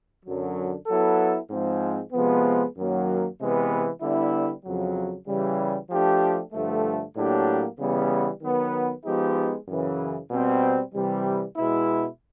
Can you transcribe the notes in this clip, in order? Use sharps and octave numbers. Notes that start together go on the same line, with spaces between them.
F#2 D3 F#3
F#3 B3 E4 A4
G#2 F3 G#3 C4
C3 F3 G#3 B3
F#2 D#3 F#3 A#3
C3 E3 G#3 B3
D3 G3 B3 E4
F2 C#3 F#3
C#3 E3 G3
F3 A3 D4 G4
G2 D3 F3 A3
A2 F#3 A#3 D4 G4
C#3 E3 G3 B3
D#3 F#3 B3
F3 G#3 B3 D#4 G4
F#2 C#3 E3
B2 G3 C4
C3 E3 G3
B2 G#3 B3 E4